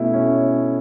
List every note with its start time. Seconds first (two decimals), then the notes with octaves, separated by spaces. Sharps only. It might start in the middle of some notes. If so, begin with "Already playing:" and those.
Already playing: B2 A3 C#4 E4
0.14 C#4